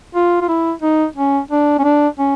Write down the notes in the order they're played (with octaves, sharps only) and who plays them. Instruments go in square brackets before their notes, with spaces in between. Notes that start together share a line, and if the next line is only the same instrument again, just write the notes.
[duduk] F4
F4
E4
D#4
C#4
D4
C#4
D4
C#4